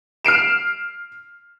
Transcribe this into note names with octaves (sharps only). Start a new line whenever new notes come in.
F6 C7 D7 E7